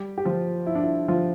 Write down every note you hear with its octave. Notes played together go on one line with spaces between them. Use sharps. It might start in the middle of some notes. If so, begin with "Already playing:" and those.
Already playing: G3 G4
G4
F3 F4
E4
D4
E4
F3 F4